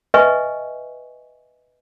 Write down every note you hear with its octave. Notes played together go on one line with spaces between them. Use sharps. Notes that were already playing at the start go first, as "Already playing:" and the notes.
B4 D#5 E5 G#5 C#6